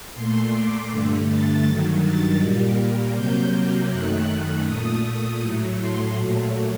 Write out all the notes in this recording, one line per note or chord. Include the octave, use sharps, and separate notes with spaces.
A#2 A3 C6
D6
G2 D3 A3
A6
G2 D#3 F#3
A6
A#2 G3 A#3
C3 F#3 A#3 G6
F#2 D#3 A3 F#6
A#2 A3 D#6
A2 F#3 A3
C6
A#2 F#3 A3